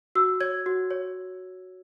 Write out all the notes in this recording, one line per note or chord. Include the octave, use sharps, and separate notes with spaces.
F#4 E6
C#5 G#6
F#4
C#5